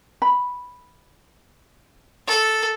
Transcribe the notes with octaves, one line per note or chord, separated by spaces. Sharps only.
B5
A4